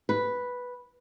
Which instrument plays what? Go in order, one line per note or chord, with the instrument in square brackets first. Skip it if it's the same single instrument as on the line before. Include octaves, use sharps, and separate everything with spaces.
[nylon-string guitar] B4